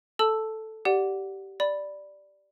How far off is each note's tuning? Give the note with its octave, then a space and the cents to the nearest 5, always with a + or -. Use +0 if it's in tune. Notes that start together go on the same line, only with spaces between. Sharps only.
A4 +0 A5 +0 E6 +0
G4 -15 D5 +0 F#5 +0
D5 +0 B5 +0